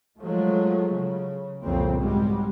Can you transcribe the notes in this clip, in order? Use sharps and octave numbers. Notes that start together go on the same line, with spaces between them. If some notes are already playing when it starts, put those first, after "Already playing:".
F3 F#3 G#3 A3
C#3
C2 F2 A#2 C#3 C4
G#2 B2 G3 G#3